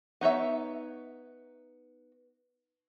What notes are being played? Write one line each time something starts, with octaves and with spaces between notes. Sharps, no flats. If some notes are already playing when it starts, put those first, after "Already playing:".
B3 D#4 C#5 E5